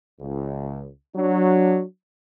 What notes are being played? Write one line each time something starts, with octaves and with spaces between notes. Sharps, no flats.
C#2
F#3 D4